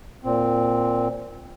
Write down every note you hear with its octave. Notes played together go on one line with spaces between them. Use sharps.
A#2 C4